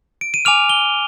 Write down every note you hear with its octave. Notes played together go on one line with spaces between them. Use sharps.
D7
D#7
G#5 D6 F6 F7
G7